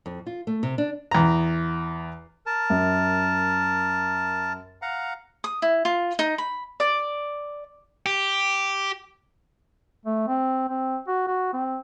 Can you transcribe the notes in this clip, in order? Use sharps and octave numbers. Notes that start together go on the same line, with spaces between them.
F2
F4
A3
C3
D4
E2 A#5
A#4 A5
F#2
F5 F#5 A#5
D#6
E4
F4
D#4
B5
D5
G4
A3
C4
C4
F#4
F#4
C4